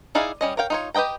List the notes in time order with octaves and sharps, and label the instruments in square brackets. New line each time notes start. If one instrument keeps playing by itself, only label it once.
[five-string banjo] D#4 E4 G#4 D5 F5
G3 C#4 D#5
A#4 C#5 F5 G5
D#4 F4 C#5
G4 B4 D#5 G5 A#5